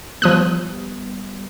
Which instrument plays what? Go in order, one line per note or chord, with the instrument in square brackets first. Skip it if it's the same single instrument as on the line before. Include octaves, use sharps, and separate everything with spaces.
[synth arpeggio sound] F3 D#6 F#6 [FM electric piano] G3 B3